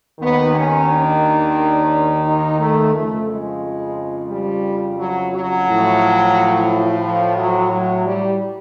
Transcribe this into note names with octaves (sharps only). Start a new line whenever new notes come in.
D#2 D#3 B3
C#4
D4
D#4
A3
F2 C#3 F3 A3
G#3
G3
F#3
F#3
A2 F3
F3
F#3
F#3
G3